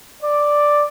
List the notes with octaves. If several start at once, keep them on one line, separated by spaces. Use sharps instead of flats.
D5